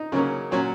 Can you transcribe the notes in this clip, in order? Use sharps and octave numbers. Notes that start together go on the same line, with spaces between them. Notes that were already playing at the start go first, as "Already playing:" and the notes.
Already playing: D#4
C#3 F#3 A#3 C#4
A#2 F#3 C#4